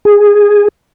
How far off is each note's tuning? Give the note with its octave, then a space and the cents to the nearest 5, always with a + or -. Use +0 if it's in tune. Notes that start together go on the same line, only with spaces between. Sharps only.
G#4 -10